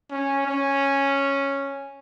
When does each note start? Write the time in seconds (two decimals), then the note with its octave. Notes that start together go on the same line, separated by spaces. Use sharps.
0.11 C#4
0.46 C#4